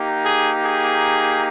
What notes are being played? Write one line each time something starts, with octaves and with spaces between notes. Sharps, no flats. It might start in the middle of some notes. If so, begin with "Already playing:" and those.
Already playing: A#3 D#4 G4
G#4
G#4